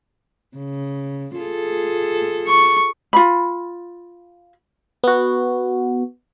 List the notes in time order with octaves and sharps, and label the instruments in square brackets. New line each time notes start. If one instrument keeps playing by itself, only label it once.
[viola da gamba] C#3
F4 G#4 A4
[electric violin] C#6
[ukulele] F4 B5
[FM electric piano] B3 F#4